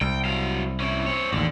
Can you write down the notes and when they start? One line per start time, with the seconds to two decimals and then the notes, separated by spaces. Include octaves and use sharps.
0.01 C2 G5
0.25 F#3 F5
0.80 C#4 E4
1.06 C4 C#5
1.33 A1 D#2 D3